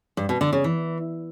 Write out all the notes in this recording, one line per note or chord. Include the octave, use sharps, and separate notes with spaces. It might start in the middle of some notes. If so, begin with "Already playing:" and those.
G2
B2
D3
C#3
E3